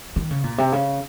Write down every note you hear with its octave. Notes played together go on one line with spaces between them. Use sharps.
D#3
C#3
A#2
C3
C#3